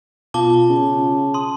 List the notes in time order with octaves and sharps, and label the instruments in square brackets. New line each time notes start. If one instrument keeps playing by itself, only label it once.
[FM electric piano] B2 F4 [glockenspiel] A5 D6 G7
[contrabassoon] C#3
[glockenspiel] C6 [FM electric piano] D#6